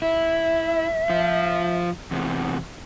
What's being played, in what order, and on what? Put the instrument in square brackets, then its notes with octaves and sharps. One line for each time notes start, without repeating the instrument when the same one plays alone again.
[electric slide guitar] E4 [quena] E5
[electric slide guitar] F3 F4
E2 C3